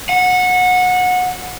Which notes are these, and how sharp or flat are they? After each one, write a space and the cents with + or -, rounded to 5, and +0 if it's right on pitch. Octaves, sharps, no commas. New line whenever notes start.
F#5 -25